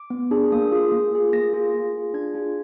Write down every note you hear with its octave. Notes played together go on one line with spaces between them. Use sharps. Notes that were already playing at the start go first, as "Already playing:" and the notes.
Already playing: D6
B3
D4 G#4
A#3 D#6
F4 G#4
A#3
F4 G#4
A#3 A#6
F4 G#4
A#3
F4 G#4
D4 G#6
F4 G#4